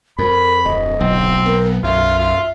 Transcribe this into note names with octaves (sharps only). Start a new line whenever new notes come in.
F2 A#4 B5
D1 D#5
B1 C4
B3 A#4
B1 F#2 F4 E5
F4